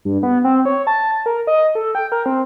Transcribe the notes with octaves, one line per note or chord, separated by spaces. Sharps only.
G2
B3
C4
C#5
A5
A5
A#4
D#5
A4
G5
A#4
C4